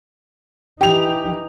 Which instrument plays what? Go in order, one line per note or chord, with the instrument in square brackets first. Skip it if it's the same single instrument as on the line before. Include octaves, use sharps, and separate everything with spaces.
[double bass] E3 D#4 [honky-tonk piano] G4 F7